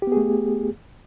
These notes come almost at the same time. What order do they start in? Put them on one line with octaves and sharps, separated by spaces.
G4 B3 G#4 A3